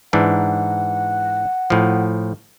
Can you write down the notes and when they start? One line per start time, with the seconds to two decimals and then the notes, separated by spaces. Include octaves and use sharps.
0.13 G#2 E3 D4 F#5
1.70 A2 F3